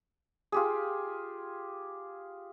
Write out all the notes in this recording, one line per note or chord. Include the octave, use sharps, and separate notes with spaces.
F4 G4 G#4